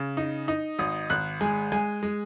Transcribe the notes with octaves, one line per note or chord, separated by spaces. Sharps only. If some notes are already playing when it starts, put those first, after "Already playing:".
Already playing: C#3
D#4
D#4
G#1 D#6
G#1 F#6
G#3 G#5
G#3 G#5
G#3